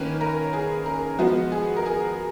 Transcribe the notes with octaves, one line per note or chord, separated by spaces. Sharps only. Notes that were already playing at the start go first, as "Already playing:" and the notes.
Already playing: D#3 A#3 C#4 B4
A#4
G#4
A#4
F3 G#3 B3 F#4
G#4
A#4
G#4